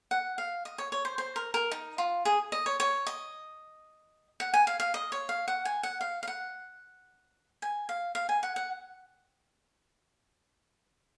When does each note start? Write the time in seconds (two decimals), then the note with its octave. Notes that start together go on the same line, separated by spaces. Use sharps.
0.11 F#5
0.38 F5
0.65 D#5
0.78 C#5
0.92 C#5
1.05 C5
1.18 C5
1.36 A#4
1.54 A#4
1.71 D#4
1.98 F4
2.25 G#4
2.52 D#5
2.66 C#5
2.80 C#5
3.07 D#5
4.40 F#5
4.54 G#5
4.67 F5
4.80 F5
4.94 D#5
5.12 C#5
5.29 F5
5.48 F#5
5.65 G#5
5.83 F#5
6.01 F5
6.23 F5
6.28 F#5
7.62 G#5
7.89 F5
8.15 F5
8.29 G#5
8.43 F#5
8.56 F#5